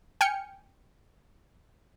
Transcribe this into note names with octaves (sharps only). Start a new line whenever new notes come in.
G5 G#5 F6 C#7